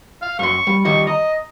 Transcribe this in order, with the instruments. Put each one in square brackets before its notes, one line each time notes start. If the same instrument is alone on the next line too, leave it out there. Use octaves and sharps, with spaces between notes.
[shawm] F5
[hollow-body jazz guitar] F#2 C6 [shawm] C#6
[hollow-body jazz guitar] G3
[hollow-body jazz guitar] D#3 G3 D#5 [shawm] C#6
[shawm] D#5 [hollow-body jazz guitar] A#5